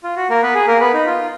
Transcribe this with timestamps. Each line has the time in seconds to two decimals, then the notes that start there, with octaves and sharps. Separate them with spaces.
0.04 F4
0.16 F#4
0.30 A#3 A#4
0.43 B3 B4
0.55 G#4
0.67 A#3 A#4
0.80 B3 B4
0.93 D#4
1.06 F4